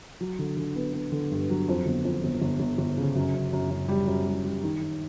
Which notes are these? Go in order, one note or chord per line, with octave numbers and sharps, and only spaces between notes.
F#3
D3
D3
B3
B3
D3
G2
F#3
F2
G1
F2
G1
G1
G1
G1
C#3
F#2
F#2
F#2
F#2
G3
F#2
G3
G3
D#3
D#3